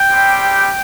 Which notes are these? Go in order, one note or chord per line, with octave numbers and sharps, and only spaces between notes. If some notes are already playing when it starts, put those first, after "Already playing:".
Already playing: G5
G3 C4 G4